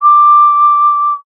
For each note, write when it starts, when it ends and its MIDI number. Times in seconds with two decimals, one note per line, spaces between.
0.01 1.14 86